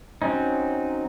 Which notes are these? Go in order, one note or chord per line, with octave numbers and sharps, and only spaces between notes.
F#3 C4 C#4 D#4